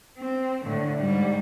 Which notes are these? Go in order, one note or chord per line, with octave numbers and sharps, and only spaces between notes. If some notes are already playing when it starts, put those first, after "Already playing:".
C4
A2 D3
G#2 G3